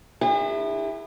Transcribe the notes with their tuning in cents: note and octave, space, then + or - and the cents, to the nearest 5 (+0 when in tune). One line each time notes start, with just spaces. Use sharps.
D3 +45 E4 +0 G#4 -45